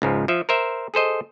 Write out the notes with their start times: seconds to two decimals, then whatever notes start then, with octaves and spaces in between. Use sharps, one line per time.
0.02 C#2 G#2 F3
0.28 F3 E5
0.49 A#4 C5 E5
0.94 G#4 A4 C5 D#5